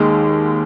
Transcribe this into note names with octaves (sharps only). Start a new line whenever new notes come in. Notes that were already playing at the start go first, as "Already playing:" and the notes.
Already playing: D#2 D#3 G#3